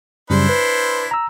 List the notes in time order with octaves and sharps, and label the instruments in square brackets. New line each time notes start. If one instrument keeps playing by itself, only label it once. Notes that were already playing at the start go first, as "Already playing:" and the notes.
[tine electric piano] F#2 C#3 G3 [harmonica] D4 E4 C5
[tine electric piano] B4
A#5 E6